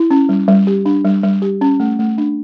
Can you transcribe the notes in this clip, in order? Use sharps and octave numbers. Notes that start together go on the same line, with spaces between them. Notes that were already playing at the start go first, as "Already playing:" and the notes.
Already playing: E4
C#4
G3
G3
G4
D4
G3
G3
G4
C#4
A3
A3
D4